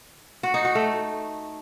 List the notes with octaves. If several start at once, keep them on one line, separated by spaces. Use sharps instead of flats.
F#4
D#4
F#4
A3